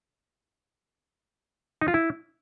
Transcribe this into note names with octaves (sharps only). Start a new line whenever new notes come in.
D#4
F4
E4